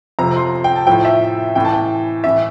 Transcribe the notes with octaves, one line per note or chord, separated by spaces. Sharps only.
F2 C3 F3 A#5
C6
G5
A5
A2 F3 G5
E5
A2 E3 G5
A5
G5
A2 E3 E5